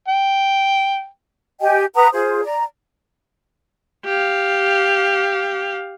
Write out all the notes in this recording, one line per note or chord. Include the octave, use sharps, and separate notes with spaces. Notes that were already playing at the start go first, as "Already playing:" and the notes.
G5
G4 D#5 G5 G#5
B4 F#5 A#5 D#6
F4 G#4 C5
D5 A#5
G4 F5